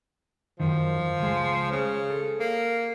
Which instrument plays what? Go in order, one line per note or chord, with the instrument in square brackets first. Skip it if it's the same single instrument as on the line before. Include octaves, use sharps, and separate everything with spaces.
[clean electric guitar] F#2 D#3 [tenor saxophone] F3
[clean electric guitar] C#2 G#3
[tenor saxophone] C#3
[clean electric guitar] A4
[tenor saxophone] A#3